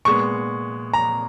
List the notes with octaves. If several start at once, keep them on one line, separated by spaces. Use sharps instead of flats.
A#2 G#3 B3 C#6
A#5